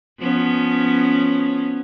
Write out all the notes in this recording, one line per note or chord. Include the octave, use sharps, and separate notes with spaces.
F3 B3 C#4